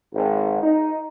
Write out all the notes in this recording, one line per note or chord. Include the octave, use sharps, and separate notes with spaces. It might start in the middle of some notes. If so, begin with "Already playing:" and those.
G#1
D#4